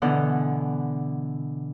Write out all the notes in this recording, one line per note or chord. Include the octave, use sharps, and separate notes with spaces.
B2 D3 E3 A4 F#5